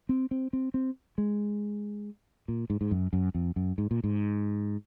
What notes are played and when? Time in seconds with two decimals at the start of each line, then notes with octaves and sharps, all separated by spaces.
0.09 C4
0.31 C4
0.53 C4
0.74 C4
1.18 G#3
2.48 A#2
2.70 G#2
2.81 G#2
2.91 F#2
3.13 F#2
3.35 F2
3.56 F#2
3.78 G#2
3.91 A#2
4.04 G#2